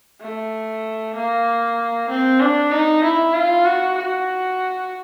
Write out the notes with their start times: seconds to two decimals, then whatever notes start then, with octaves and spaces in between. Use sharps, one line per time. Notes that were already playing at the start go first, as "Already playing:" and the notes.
0.21 A3
1.15 A#3
2.09 C4
2.40 D4
2.71 D#4
3.03 E4
3.34 F4
3.66 F#4
3.97 F#4